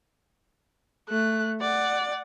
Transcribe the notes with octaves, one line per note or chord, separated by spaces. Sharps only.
A3 F#6
D5 F#5